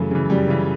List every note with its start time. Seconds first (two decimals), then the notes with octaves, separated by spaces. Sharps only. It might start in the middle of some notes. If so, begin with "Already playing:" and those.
Already playing: F#2 C#3 E3 A3
0.11 C#3 E3
0.30 F#2 G3
0.48 C#3 E3